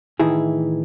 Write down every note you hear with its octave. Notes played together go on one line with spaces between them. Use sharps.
A2 D#3 E3 E4 G#4